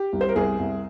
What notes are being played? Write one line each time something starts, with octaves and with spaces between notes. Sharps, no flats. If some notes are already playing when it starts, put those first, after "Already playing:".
Already playing: G4
C2
C5
A#4
C2 G#4
C2